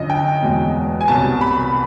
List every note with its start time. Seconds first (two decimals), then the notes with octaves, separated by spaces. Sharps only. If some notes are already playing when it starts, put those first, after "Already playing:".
Already playing: F#2 D3 F3 D#5
0.10 G5
0.42 E2 B2 G#3
1.01 G#5
1.08 C2 B2 F#3 A5
1.41 B5